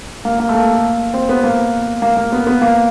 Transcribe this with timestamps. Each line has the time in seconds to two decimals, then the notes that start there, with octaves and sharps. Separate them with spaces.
0.25 A#3
0.40 A#3
0.49 A3
0.55 A#3
1.14 C4
1.29 B3
1.44 A#3
2.02 A#3
2.17 A#3
2.32 B3
2.47 B3
2.62 A#3